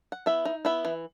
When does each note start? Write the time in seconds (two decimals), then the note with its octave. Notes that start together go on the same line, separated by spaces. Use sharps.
0.12 F#5
0.26 B3 E4 E5
0.45 D#4
0.65 B3 E4 E5
0.85 E3